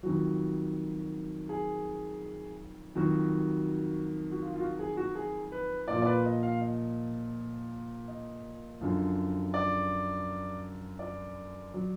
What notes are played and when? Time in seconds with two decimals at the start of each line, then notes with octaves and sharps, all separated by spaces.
0.03 F2 D#3 F#3 F#4
1.49 G#4
2.95 F2 D#3 F#3 F#4
4.31 F#4
4.42 F4
4.56 F4
4.60 F#4
4.79 G#4
4.97 F#4
5.15 G#4
5.52 B4
5.88 A#2 F3 D5
6.02 D5
6.06 B4
6.25 D#5
6.43 F5
6.61 D#5
8.08 D#5
8.81 F#2 D3 F3
9.54 D5
10.99 D5
11.74 F#3